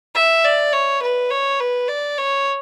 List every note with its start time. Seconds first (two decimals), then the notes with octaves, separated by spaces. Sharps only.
0.15 E5
0.44 D5
0.73 C#5
1.03 B4
1.30 C#5
1.60 B4
1.88 D5
2.18 C#5